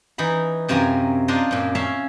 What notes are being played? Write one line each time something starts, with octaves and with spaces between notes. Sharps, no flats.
E3 D#4 B5
F#2 C3 F4 A#4 G#5 A#5
D4 F4 A#4 C5 D#5
F#2 A#2
C#4 E5 F5 A5